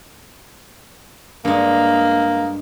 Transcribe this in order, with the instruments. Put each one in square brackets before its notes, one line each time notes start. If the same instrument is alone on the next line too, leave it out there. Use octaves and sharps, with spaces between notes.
[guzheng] G2 G#3 [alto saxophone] A#3